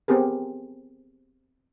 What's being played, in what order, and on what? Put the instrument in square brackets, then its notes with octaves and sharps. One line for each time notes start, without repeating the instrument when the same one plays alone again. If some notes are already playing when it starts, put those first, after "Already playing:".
[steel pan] B3 C4 G4 G#4 A#4